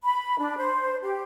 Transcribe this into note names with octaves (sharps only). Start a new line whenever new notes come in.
B5
D4
C5
G4